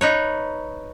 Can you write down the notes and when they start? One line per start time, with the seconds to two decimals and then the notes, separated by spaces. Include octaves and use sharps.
0.01 D#4 B4 C#5